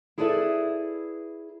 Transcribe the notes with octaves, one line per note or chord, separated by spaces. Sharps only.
E4 G#4 A4 B4 D5 E5